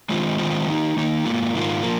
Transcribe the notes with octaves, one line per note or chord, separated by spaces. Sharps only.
D#3 G#3 C4 F4
D#3 G#3 C4 F4
D#3 A#3 D#4
D#3 A#3 D#4
G#2 D#3 A#3 F4
G#2 D#3 A#3 F4
F3 A#3